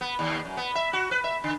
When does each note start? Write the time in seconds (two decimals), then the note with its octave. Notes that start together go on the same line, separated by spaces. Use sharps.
0.01 B3
0.19 D#2
0.45 F#2
0.57 B3
0.75 E5
0.93 F#4
1.11 B4
1.24 E5
1.44 D3